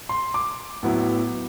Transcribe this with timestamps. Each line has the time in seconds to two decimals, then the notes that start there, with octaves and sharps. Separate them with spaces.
0.09 C6
0.34 D6
0.83 A2 F#3 B3 E4